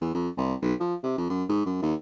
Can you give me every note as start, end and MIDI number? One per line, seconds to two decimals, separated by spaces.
0.01 0.12 40
0.14 0.28 41
0.37 0.54 36
0.62 0.73 35
0.80 0.95 53
1.03 1.15 48
1.18 1.26 41
1.30 1.44 42
1.49 1.62 44
1.66 1.78 42
1.82 1.94 39